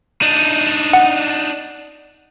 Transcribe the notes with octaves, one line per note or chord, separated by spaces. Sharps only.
D4 D#4
F#5